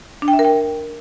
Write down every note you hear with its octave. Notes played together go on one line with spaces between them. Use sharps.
D4
G5
E5
A#4
G5